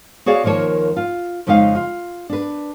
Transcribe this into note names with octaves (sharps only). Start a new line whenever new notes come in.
F#4 G#4 C#5 D5 F5
D#2 D#3 F3 A#3 C#5
F4
F2 C#3 G#3 D#4 A#4 F5
F4
D4 B4